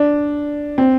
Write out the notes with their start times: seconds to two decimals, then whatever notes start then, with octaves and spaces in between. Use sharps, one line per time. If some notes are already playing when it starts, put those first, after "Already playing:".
Already playing: D4
0.78 C4